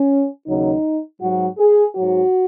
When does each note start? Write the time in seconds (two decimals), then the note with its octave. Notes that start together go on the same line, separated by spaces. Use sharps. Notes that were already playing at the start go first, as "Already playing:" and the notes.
Already playing: C#4
0.47 D#2 C#3 F#3 D#4
1.21 G#2 F#3 F#4
1.58 G#4
1.95 G#2 F#3 F#4